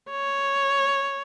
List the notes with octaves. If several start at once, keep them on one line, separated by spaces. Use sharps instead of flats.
C#5